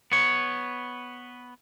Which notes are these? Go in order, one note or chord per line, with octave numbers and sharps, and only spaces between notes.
B3 C#5